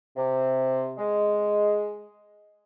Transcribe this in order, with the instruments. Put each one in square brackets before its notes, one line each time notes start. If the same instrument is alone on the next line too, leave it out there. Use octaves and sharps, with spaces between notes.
[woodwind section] C3
G#3